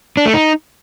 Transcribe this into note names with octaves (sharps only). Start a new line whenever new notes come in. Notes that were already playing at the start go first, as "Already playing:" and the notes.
D4
A3
D#4